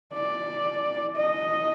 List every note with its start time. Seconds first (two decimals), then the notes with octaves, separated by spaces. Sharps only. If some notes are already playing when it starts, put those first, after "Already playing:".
0.14 D5
1.16 D#5